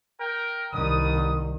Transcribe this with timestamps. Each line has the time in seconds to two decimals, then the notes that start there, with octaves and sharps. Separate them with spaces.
0.20 A#4 G5
0.72 C2 D#3 G3 B4 D#6